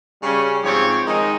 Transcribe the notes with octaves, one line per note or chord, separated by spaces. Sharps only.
C#3 G3 C#4
G#2 F3 C4 G4 C#5
D#3 G#3 D#4